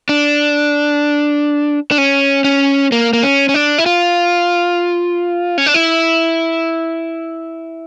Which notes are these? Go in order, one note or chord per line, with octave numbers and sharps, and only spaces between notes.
D4
D4
C#4
C#4
A#3
A#3
C#4
C#4
D4
E4
F4
C#4
D4
E4